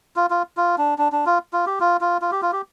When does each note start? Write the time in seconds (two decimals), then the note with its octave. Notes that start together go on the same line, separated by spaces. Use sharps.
0.16 F4
0.30 F4
0.57 F4
0.78 D4
0.98 D4
1.12 D4
1.26 F4
1.53 F4
1.66 G4
1.80 F4
2.01 F4
2.22 F4
2.32 G4
2.42 F4
2.52 G4